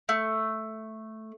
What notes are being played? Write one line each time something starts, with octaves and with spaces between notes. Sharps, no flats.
A3